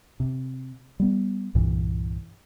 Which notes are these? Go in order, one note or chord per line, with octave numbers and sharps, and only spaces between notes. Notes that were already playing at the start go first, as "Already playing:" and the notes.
C3
G3 B3
C2 G2 A#2 E3